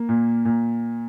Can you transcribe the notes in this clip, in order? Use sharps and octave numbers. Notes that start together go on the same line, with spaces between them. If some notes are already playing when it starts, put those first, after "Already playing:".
Already playing: A#3
A#2
A#2